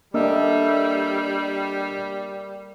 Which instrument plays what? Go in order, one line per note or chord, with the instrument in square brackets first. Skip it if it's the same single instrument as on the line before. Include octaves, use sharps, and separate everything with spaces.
[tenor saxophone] G3 [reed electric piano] A#3 D4 D#5 [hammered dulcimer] A4 A#4 E5